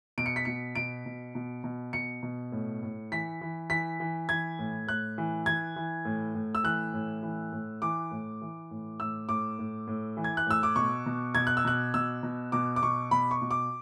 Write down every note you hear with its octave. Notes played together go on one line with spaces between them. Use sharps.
B2 D7
C#7
B6
B2 C#7
B2 D7
B2
B2
B2
B2 C#7
B2
A2
A2
E3 B6
E3
E3 B6
E3
E3 G#6
A2
A2 F#6
E3
E3 G#6
E3
A2
A2
E6
E3 F#6
A2
E3
A2
E3 D6
A2
E3
A2
A2 E6
A2 D6
A2
A2
E3
G#6
F#6
A2 E6
D6
B2 C#6
B2
B2 G#6
F#6
E6
B2 F#6
B2 E6
B2
B2 D6
D6
B2 C#6
B2 B5
C#6
B2
D6